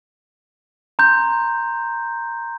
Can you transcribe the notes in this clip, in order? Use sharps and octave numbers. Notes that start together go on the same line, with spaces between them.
A#5 C6 G6